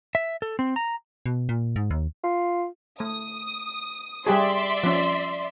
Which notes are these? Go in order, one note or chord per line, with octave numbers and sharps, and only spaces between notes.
E5
A4
C4
A#5
B2
A#2
G#2
D#2
F4
A3 D#6
G3 G4 G#4 D5 E5 C6
F3 C#4